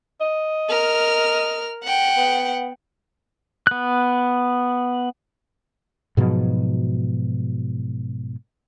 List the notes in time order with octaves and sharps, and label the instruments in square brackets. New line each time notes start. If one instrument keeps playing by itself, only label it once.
[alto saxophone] D#5
[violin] A#4 F6
F#5 G5
[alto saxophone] B3
[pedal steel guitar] B3 F#6
[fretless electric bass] G#2 B2 F3 F#3